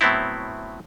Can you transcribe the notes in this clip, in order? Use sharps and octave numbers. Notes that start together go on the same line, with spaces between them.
A2 F#3 B3 C4 E4